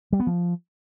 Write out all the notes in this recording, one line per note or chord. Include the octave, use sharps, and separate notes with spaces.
G3
B3
F3